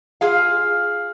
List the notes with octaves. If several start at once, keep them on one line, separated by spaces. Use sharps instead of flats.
F4 G#4 F5